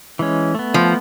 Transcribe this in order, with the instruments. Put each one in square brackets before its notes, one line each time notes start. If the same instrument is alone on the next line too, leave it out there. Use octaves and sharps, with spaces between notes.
[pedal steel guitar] E3 G#3 C#4
A3 B3
[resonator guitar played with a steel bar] F3